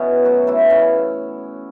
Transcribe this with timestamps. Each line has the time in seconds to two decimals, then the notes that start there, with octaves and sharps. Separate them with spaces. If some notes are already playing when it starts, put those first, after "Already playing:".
Already playing: B2 E3 B3 C#4
0.25 A2 F#3 F#4
0.47 E3 E4
0.59 A2
0.70 C#3 C#4